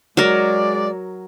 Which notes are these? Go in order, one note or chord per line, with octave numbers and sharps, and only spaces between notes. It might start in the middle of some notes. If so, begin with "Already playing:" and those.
F#3 G#3 A#4 D5